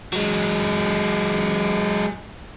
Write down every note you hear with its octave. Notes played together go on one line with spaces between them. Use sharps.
F#3 G#3